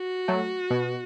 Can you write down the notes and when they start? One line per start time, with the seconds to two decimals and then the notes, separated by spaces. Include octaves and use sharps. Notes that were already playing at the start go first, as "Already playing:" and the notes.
Already playing: F#4
0.28 F#3 A3
0.70 B2